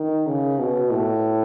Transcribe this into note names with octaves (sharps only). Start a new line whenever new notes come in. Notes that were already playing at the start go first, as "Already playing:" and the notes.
Already playing: D#3
C#3
B2
A2